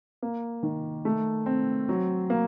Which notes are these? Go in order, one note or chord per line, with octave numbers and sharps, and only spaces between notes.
A#3
D#3
A3
C4
F#3
A#3